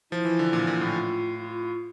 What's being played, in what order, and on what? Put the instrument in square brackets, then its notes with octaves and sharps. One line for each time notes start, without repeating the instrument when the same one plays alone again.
[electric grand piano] F3 [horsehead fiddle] E4
[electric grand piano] E3
D3
A#2
A#2
A2
[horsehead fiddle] F4
F4